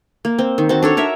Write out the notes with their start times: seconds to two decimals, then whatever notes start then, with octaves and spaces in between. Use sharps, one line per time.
0.25 A#3
0.39 C4
0.58 D#3
0.69 C4 F#4 A5
0.83 D4 A4 C#5
0.97 A#4 C#5 E5